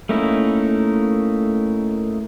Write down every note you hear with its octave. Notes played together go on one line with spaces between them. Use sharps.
A3 A#3 C#4 D#4 E4